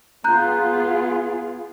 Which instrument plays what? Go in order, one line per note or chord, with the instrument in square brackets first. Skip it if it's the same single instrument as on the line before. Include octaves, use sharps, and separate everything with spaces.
[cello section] B3 F4 G#4 [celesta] A#5 F#6 G6